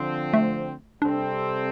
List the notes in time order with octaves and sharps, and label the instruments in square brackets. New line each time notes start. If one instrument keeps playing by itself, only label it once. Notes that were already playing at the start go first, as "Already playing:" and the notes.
Already playing: [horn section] D3 F3 C4
[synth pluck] A3
[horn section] C3 G3 C4 A4 [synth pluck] D4